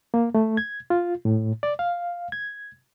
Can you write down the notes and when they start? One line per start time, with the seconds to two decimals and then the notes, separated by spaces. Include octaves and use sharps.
0.14 A#3
0.35 A3
0.57 G#6
0.90 F4
1.25 A2
1.63 D5
1.79 F5
2.32 G#6